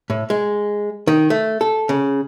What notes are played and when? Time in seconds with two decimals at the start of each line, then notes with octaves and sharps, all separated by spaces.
0.10 A2
0.30 G#3
1.07 D#3
1.30 A3
1.61 A4
1.89 C#3